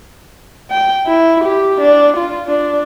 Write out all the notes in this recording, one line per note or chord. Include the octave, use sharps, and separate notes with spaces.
G5
E4
G4
D4
F4
D4